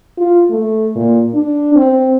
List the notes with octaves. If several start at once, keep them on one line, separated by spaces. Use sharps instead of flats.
F4
A3
A#2
D4
C4